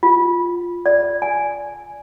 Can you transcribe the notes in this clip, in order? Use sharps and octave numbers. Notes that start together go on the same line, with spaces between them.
F4
D5
G#5